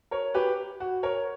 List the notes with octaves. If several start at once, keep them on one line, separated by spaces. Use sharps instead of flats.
A#4 C#5
G4 B4
F#4
A#4 C#5